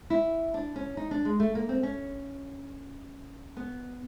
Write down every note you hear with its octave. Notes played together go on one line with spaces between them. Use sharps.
E4
D4
C#4
D#4
D4
G#3
A3
A#3
C4
C#4
B3